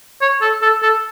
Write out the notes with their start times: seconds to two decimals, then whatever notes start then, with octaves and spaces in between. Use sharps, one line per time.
0.22 C#5
0.42 A4
0.62 A4
0.82 A4